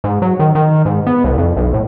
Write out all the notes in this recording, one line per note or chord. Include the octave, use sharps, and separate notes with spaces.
G#2
F#3
D#3
D#3
G#2
B3
C2
F2
B1
A2